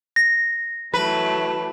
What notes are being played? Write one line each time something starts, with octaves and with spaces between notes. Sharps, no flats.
A#6
E3 F#3 A3 B4